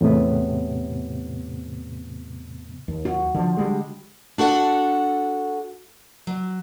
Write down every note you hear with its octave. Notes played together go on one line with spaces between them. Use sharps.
E2 A2 C3 B3
D#2
F#4
D3 E3 F3
D3 G3 G#3
D4 F#4 A4 F#5
F#3